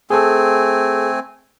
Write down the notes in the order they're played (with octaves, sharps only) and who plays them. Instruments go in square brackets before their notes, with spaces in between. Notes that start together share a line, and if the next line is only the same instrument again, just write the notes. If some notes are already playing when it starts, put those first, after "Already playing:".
[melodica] A3 C4 G#5 [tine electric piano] G#4 A4